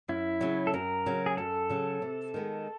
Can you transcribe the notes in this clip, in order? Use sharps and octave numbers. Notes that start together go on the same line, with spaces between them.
F#2 E4
C#3 F#3
A4
F#2 A#4
C#3 F#3
G#4
F#2 A4
C#3 F#3
C3
D#3 G#3 B3